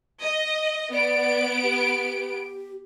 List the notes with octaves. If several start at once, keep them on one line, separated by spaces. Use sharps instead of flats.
D#5
B3 D5 D7
G4